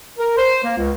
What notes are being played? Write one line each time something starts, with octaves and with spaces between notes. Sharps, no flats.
A#4
C5
A#3
C#2